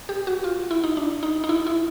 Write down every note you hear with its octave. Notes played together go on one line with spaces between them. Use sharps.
G4
F#4
F4
E4
D#4
D4
D#4
D#4
E4
E4